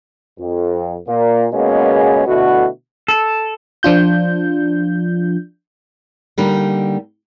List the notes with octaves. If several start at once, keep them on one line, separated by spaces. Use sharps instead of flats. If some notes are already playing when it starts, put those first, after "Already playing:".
F2
A#2 A#3
B2 G#3 A#3 B3 C#4 G#4
B2 D3 A3 E4 F#4
A4
F3 D4 F4 G6
D3 G3 A#3 D#4